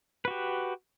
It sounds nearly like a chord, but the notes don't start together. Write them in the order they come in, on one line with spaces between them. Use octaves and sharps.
B4 F#4 G4